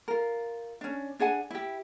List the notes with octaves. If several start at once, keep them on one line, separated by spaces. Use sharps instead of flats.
F4 A#4
C#4 D4
D4 G#4 F#5 G#5
E4 G4